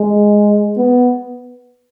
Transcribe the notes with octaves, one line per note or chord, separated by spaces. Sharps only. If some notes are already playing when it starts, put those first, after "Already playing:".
Already playing: G#3
B3